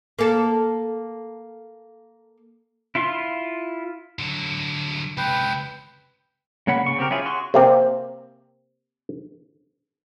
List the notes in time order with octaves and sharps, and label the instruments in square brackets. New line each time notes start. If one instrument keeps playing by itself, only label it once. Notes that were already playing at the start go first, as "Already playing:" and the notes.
[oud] A#3 A4
[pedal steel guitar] E4 F4 F5 C6
[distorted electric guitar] D3 F#3
[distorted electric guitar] C#2 C3 [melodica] B4 G5
[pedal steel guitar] C#3 A#3 C#5 F#5 B5
C#3 C#6
C4 G4 A#4
C#4 E4 F4 G#4
F#4 G#4 C6 C#6
[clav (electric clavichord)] C3 A#3 C4